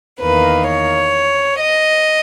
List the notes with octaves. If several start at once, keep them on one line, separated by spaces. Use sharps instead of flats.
E2 D#3 A#3 B4
C#5
D#5